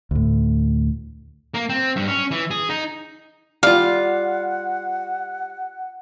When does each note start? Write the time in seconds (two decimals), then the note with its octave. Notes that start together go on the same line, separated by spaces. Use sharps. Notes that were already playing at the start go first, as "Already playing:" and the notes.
0.11 D2 A2
1.54 A#3
1.69 C4
1.96 G2
2.08 C#4
2.31 E3
2.51 G#4
2.70 D#4
3.63 G3 F4 F5 F#5